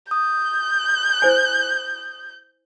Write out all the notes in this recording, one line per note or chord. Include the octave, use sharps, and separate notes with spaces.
D#6 G6
E4 C5 G#5